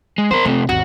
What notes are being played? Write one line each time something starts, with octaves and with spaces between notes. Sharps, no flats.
G#3
B3 A#4 C5
C3 A3 C4
G#1 D#2 F#4